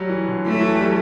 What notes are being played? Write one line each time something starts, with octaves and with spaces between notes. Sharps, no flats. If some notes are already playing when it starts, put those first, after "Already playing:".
Already playing: F#3 G3 A3
E3
D3
E3 A3
F#3
E3
G3
F#3